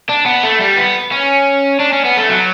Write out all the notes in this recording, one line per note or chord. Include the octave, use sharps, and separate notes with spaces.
D4
B3
A3
G3
B3
C#4
D4
C#4
B3
A3
F#3